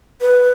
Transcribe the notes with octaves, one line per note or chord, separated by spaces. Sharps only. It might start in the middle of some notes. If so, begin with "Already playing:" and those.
B4